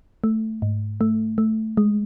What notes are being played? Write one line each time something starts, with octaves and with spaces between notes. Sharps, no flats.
A3
G#2
A3
A3
G#3